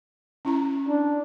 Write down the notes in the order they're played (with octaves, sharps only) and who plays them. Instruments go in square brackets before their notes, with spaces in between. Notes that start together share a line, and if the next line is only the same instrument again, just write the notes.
[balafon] C#4 E4 A#5
[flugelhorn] D4